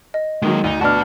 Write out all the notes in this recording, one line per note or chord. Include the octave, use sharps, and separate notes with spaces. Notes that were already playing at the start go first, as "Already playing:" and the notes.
D#5
D#3 F#3 G#3 A#3
D2 D#4
D2 D4 F#4 B4 A5 F6